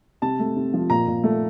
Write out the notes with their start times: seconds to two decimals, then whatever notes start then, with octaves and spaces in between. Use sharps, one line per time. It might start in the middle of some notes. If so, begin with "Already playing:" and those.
0.22 C3 A5
0.39 A3
0.56 C3
0.74 F3
0.90 A#2 A#5
1.08 A#2
1.24 A3